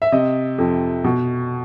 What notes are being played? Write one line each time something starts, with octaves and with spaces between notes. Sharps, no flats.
E5
C3 D#5
F2
B2